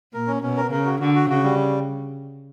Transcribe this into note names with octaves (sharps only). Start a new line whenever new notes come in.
A#2 A#4
C#4
B2 C#4
A#4
C#3 A#4
F#4
D3 F#4
F#4
C#3 F#4
G3